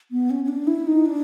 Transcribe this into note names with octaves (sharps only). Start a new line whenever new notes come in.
B3
C#4
C#4
D4
E4
D#4
D4